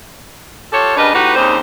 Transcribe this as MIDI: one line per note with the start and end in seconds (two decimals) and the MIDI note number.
0.72 0.94 65
0.72 0.94 67
0.72 0.94 69
0.72 0.94 73
0.96 1.12 43
0.96 1.12 49
0.96 1.12 62
0.96 1.12 70
0.96 1.12 71
0.96 1.12 75
1.13 1.35 45
1.13 1.35 63
1.13 1.35 66
1.13 1.35 67
1.13 1.35 71
1.35 1.57 39
1.35 1.57 49
1.35 1.57 60
1.35 1.57 62
1.35 1.57 63
1.35 1.57 72